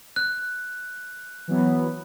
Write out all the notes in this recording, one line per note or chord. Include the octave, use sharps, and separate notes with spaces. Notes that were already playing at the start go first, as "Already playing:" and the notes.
F#6
E3 F#3 B3